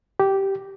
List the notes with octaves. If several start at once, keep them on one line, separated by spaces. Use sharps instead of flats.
G4